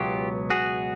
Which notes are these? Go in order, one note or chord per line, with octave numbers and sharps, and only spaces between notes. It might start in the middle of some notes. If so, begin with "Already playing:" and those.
Already playing: C#2 B2 F#3 B3 F4 G4
F#4 G#4